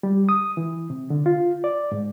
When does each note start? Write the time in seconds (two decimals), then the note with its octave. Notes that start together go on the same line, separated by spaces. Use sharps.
0.03 G3
0.29 D#6
0.57 E3
0.90 C3
1.10 D3
1.26 F4
1.64 D5
1.92 G#2